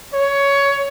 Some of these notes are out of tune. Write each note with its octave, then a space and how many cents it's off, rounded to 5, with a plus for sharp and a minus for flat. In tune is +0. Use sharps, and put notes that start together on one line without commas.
C#5 +15